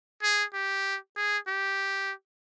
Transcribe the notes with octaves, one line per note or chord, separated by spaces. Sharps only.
G#4
G4
G#4
G4